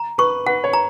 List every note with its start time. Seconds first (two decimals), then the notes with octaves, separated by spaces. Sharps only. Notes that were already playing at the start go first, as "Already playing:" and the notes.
Already playing: A#5
0.18 B4 C#6
0.46 B4 F#5
0.64 C#5
0.73 A#5